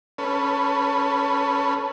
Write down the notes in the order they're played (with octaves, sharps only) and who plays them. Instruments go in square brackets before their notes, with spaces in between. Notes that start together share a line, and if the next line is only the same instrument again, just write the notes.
[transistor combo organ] C#4 A4 B4